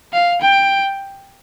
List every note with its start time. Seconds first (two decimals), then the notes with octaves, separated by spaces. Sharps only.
0.13 F5
0.41 G5